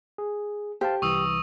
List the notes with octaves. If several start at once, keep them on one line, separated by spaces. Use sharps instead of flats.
G#4
G4 C5 F5 A5
C2 E3 C#6 D#6 E6